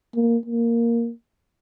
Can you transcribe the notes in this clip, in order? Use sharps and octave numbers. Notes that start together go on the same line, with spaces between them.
A#3
A#3